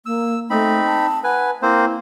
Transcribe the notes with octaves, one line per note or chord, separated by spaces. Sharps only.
A#3 E6
A3 C4 D#4 B5
A5
B4 F#5 G#5
A#3 C4 E4 C5